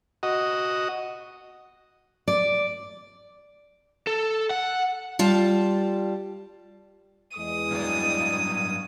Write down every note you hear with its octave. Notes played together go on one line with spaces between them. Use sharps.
F#4 D#5
D5
A4
F#5
G3 F4 A5
E2 G#3 D#6
G2 F#3 D5